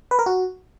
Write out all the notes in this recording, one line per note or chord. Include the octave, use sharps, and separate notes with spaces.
B4
A#4
F#4